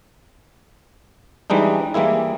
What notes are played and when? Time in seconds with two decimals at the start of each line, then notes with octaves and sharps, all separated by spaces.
1.50 E3 G3 G#3 D4 D#4
1.94 E3 G3 G#3 A#3 E4